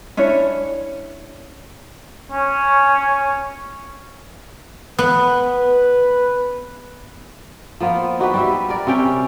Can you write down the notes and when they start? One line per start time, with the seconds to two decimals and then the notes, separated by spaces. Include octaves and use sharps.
0.17 C#4 D4 E4 C#5
2.32 C#4
4.99 B3 B4
7.80 F3 A#3 B3 F4
8.19 D#4 F#4 G4 B4
8.34 G3 G4 E5
8.69 A#4 D5
8.87 C3 G3 C#4 G5